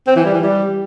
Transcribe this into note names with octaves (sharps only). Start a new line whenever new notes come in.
C4
E3
G3
E3
G3